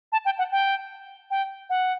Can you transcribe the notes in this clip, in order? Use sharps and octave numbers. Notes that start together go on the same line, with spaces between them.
A5
G5
F#5
G5
G5
F#5